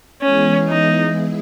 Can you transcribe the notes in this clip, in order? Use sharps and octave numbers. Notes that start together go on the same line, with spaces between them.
E3 G#3 B3 C#4 E4 G#4
D#4